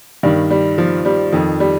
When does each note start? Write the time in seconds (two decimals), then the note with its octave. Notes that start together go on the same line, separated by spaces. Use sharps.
0.23 G2 D#3 G3
0.50 G3
0.78 F3
1.05 G3
1.33 F2 D#3
1.60 G3